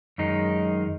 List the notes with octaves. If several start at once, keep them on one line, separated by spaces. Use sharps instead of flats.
F#2 D#3 G#3 D#4